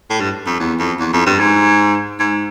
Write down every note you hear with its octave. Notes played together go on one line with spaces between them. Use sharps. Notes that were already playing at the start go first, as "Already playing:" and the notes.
A2
G2
F2
E2
F2
E2
F2
G2
G#2
G#2